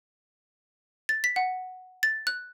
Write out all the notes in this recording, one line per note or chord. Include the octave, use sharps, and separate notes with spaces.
A6
B6
F#5
A6
F#6